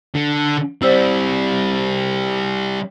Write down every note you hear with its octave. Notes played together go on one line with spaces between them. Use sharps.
D3
G3 C4 C5 D5 E6